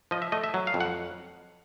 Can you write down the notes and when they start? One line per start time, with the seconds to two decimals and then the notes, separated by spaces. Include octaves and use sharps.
0.11 F3 D#5
0.22 E5
0.32 A3 D#5
0.44 E5
0.54 F#3
0.67 F5
0.74 F2
0.80 F#5